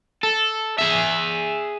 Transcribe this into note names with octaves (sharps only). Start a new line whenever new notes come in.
A4
G#4 E5